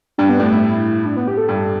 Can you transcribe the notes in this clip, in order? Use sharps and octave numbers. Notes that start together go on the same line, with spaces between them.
G2 D4
B3
A2 D4
E4
D4
B3
G4
A4
G2